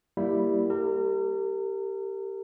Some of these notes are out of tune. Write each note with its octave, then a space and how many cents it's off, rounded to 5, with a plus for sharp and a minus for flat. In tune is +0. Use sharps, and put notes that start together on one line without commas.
G3 +0 A#3 +0 E4 +0
G4 +0 A#4 -35